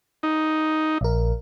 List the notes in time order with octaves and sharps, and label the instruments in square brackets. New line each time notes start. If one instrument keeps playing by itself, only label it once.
[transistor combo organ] D#4
[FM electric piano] A#1 A#4